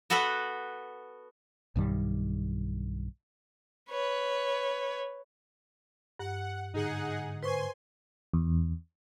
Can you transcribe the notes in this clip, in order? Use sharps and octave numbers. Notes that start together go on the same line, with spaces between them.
B3 F#4 A4 B4 F#5
B1 G2 D#3 G3
B4 C#5
G2 F#5
G#2 D3 D#4 G#4 F#5
B4 C5 G#5 C6 C#6
E2